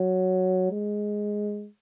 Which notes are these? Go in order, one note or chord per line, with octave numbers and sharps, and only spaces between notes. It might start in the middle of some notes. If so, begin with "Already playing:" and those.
Already playing: F#3
G#3